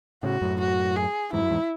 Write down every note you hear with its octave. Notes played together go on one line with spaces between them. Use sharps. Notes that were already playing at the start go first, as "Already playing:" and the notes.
A2 C#3 F#4
F#2 A2
F#4
G#4
E2 G#2 E4
F#2
E2 G#2